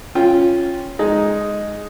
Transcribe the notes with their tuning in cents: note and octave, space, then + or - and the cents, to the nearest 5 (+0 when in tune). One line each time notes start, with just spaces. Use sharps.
C#4 +0 F4 +0 G5 +0
G#3 +0 D#4 +0